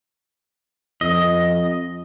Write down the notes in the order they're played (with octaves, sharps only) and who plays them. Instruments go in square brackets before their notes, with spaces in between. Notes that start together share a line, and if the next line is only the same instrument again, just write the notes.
[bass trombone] F2 [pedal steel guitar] D#5